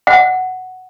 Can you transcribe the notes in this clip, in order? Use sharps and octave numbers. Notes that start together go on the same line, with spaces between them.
F#5